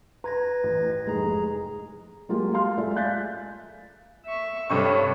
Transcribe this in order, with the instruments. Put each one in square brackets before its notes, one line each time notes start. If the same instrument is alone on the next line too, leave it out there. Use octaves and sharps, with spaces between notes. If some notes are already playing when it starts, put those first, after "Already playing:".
[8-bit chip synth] B4 G#6 A#6 [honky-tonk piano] A#5
[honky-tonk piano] A1
[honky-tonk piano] F1 G#2 [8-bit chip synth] G#4 A#5
[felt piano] F#3 G#3 A#3 F4 G4
F5 A5 C6 F6
G#3 A3 F4 D5 E5
F5 G#5 F#6 G6 A6 B6
[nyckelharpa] E5 C#6
[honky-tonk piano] G2 C3 C#6 [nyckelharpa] A4 C#5